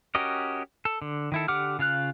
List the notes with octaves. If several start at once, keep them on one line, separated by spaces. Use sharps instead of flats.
C#4 F#4 G4 A#4 D#5
A4
D3
D#3 E4 A4
D3 G4 F#5 D6 F6
C#3 F4 F5 F#6